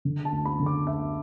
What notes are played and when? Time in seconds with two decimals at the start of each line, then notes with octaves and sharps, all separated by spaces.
0.05 D3
0.25 A5
0.32 D2
0.45 B5
0.60 D3
0.66 D6
0.87 D2 E5